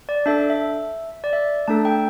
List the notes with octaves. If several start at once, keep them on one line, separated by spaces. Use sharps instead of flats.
D5
D4 A4 E5
E5
D5
E5
A3 D4 A4 A5
G5